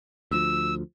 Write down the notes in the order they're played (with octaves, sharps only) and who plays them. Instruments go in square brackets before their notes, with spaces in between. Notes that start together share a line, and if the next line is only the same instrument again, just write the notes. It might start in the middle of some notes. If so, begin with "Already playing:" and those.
[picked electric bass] D2 F3 [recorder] E6